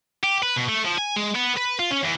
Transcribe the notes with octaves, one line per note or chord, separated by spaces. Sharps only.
G4
B4
B2
A3
F3
G#5
G#3
B3
B4
F4
C#4
E2